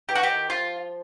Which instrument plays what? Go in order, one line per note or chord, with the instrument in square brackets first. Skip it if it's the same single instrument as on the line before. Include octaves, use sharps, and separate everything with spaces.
[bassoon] E3 [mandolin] G4
[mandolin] F#4
G4
[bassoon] D#3
[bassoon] F3 [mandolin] F4